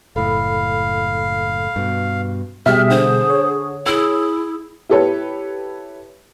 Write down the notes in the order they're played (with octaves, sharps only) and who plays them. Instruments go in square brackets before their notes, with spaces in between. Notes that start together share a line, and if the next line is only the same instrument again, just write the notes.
[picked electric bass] F#1 A2 [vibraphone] A4 B5 [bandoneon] F5
[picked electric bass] G2 B2
[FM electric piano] B2 G3 [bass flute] G#4 [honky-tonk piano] E5 G5 [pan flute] F6
[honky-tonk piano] D3 [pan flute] C5
[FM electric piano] C#5
[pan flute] E4 [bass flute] G#4 [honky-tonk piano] E6
[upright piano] E4 G4 A4 B4 C#5